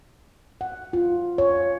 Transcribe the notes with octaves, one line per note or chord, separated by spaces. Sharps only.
F#5
F4
C#5